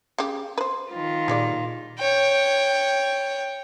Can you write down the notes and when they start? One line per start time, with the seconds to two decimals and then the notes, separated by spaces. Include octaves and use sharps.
0.18 C#3 G4
0.58 B4 C5
0.92 D#3 F4
1.28 A#2 G3 G#3 D5
1.99 C#5 G5